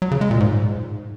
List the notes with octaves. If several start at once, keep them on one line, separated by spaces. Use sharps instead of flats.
F#3
C#3
G#3
A#2
G#2